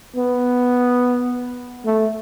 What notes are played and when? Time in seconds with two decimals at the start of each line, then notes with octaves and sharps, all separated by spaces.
0.16 B3
1.86 A3